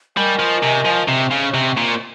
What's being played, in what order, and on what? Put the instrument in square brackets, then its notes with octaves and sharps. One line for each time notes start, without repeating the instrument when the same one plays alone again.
[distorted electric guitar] G3 [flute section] A#4 D#5 G#5 C#6
[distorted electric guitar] F3
C3
F3
[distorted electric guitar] C3 [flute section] C5 D#5 G#5 C#6
[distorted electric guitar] C#3
C3
A#2